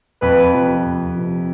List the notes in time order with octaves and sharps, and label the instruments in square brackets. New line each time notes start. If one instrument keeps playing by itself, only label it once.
[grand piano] F2 [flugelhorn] B4
[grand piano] C3 F3
F2
C3 F3